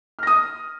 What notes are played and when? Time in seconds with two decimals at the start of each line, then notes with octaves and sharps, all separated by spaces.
0.19 F6
0.23 A#6
0.27 D#6